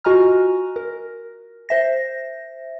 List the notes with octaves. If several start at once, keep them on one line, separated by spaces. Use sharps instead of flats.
F4 F#4 D#5 G#5 A#5 F6
A#4
C5 E5 A#6